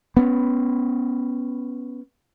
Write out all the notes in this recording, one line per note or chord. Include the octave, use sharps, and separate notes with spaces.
B3 C#4